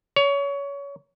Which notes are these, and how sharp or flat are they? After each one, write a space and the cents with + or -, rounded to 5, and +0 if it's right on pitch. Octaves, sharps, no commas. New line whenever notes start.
C#5 +25